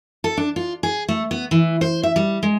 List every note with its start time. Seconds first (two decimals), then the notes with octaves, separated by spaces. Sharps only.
0.24 A4
0.37 D4
0.56 F4
0.83 G#4
1.08 A3
1.31 B3
1.51 E3
1.81 C5
2.03 E5
2.16 G3
2.43 G#3